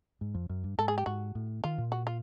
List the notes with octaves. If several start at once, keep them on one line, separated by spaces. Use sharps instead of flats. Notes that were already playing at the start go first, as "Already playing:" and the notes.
G#2
F2
F#2
G2
G#2 A4
G#4
G4
G#2 F#4
A2
D#3 F4
A#2
F#4
F4